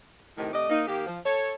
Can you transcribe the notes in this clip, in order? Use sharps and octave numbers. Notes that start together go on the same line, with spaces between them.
A2 C3 D#3
C3 A3 D5 D#5
A#3 D#4
D#3 A#3 G4
F3
A4 C#5